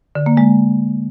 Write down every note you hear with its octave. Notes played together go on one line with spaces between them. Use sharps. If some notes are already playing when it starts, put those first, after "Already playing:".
D3
A#3
G#3